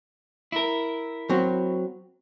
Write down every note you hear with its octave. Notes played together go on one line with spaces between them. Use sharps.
E4 A#4
F#3 C4 F#4